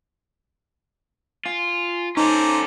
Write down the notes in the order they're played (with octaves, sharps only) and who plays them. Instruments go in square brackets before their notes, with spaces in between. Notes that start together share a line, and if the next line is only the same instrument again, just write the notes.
[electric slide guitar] F4 [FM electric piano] G#5
[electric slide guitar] C#4 A4 [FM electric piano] D#4 [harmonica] C5 A#5 D6